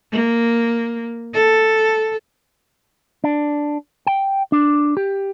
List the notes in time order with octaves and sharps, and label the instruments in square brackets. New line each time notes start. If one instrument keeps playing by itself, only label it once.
[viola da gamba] A#3
A4
[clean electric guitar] D4
G5
D4
G4